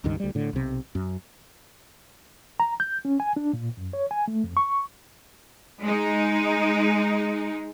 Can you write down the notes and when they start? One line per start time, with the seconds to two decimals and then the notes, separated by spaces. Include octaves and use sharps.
0.04 C#2 G2 D#3
0.20 D2 G3
0.35 A2 D3
0.53 B1 C3
0.95 F#2
2.60 A#5
2.80 G6
3.05 C#4
3.20 G#5
3.36 D4
3.53 A#2
3.77 F#2
3.93 C#5
4.11 G#5
4.28 A3
4.44 F2
4.57 C#6
5.84 G#3 D#4